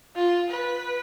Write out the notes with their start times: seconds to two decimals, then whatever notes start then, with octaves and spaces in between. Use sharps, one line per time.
0.16 F4
0.50 B4